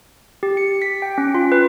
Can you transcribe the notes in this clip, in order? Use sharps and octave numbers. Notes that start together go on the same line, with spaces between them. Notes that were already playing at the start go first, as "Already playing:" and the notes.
G4
C#7
B6
G5
C#4
F4
B4